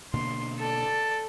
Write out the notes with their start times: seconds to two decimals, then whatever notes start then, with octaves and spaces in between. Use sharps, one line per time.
0.14 B2 D3 A#3 C6
0.59 A4 D5